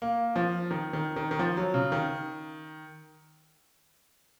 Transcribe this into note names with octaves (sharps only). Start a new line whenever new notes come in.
A#3
F3
D#3
D#3
D#3
D#3
F3
F#3
C#3
D#3